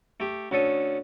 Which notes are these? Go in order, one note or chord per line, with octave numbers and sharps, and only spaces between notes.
A3 G4
D2 C#4 A4 D#6